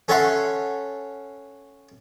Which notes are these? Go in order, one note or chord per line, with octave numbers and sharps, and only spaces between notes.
C#4 A4 C#5 E5 F#5 C6